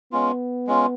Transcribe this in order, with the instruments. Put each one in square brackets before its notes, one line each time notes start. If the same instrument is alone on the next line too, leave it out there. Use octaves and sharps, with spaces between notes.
[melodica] G#3 C#4 F4 [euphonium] B3
[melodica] G#3 C#4 F4